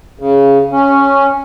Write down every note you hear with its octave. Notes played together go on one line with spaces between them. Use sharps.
C#3
C#4